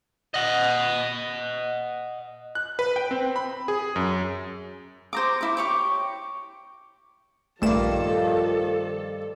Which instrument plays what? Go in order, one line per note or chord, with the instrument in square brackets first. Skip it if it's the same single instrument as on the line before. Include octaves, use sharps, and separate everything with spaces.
[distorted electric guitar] D#5 F#5
[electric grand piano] F#6
B4
G5
C4
B5
G#4
F#2
[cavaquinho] C5 A#5 D6
E4 D6
G4 C#5 D6
[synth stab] A#1 A3 E7 [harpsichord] G2 A#3 [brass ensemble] D#3 F3 [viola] A4